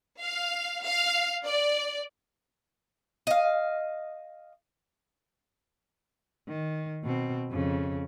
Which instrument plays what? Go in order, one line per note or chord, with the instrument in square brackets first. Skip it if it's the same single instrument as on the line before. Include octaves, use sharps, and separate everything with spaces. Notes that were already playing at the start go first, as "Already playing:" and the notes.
[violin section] F5
F5
D5
[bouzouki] D#5 F5
[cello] D#3
B2 C4
F2 C#3